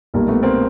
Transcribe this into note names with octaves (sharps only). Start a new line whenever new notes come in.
B1 A#2 G3 A#3
A3 B3
A#3 C4